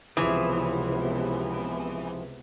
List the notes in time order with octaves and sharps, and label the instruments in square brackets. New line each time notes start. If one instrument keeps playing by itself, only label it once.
[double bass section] C#2 C3 B3 [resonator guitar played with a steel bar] E3 [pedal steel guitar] F3 E4 G#4